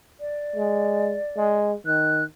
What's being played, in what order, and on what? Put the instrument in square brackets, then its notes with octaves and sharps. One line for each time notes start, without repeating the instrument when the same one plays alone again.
[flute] D5
[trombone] G#3
G#3
[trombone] D#3 [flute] F#6